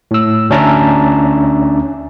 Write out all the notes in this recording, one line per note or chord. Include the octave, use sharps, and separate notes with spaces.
A2 E6
D2 C#4 D4 E5 A5 A#5